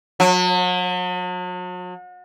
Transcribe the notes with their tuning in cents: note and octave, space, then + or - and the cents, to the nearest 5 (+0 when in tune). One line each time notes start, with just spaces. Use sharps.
F#3 -40